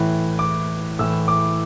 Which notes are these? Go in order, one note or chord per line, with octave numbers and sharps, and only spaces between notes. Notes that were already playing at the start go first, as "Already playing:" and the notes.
Already playing: A2 E3
D6
A2 E3 E6
D6